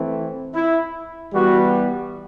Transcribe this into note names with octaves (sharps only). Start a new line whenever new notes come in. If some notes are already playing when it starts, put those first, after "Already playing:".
Already playing: E3 A3 C4
E4
E3 G3 B3 F#4